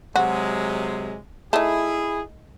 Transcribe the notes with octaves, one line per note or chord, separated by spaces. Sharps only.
C3 F#3 G#3 F#4
A3 D#4 E4 G#4